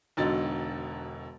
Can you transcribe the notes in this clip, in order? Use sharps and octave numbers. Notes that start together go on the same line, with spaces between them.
E1 B2 D3 D#4 A6